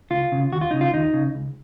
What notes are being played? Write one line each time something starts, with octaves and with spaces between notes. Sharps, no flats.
C#2 F4
C#3
D#2 F#4
F4
C#3 D#4
F4
D#2 D#4
C#3
C#2